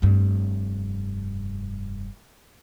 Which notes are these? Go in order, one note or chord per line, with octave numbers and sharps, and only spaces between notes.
F1 G2